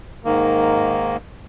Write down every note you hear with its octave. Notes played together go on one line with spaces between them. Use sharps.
G#2 D#3 A#3